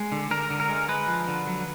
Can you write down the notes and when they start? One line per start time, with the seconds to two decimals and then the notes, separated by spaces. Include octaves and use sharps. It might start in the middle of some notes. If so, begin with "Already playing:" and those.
Already playing: G#3
0.12 D3
0.31 D3 A#4
0.50 D3
0.60 A#4
0.69 G#3
0.89 G#3 B4
1.08 F3
1.28 D3
1.47 F#3